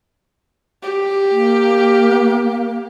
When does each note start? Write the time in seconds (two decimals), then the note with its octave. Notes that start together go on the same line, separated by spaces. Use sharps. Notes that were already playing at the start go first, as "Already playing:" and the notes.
0.83 G4
1.30 A#3